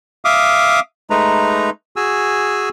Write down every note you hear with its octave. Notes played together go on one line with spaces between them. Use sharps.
E5 F5 D6 D#6
G#3 A3 D#4 B4 A#5
F#4 G#4 G#5 E6